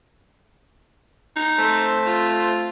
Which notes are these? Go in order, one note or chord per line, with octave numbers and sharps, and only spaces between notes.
D#4
A3 C4 C5
F4